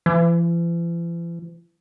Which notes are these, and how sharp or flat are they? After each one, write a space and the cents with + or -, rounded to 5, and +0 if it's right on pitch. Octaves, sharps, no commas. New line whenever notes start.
E3 +45